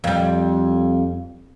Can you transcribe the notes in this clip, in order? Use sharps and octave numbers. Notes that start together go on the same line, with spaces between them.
F2 G3